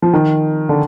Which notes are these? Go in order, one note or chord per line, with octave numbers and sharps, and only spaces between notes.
F3
D#3
D3